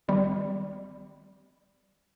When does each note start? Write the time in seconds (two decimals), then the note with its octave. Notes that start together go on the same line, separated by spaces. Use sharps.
0.08 G#1 G3